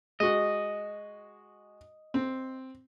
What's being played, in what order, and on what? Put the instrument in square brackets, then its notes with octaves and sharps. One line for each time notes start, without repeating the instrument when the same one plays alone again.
[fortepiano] G#3 F#4 [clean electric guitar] D#5
[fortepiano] C4